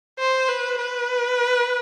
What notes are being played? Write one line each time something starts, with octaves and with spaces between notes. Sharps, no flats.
C5
B4
B4